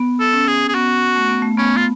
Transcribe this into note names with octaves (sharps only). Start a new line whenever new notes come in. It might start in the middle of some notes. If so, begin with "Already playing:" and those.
Already playing: B3
A4
C#4
G#4
G#4
B3 F#4
A3
B3
A3
B3 C#4
F4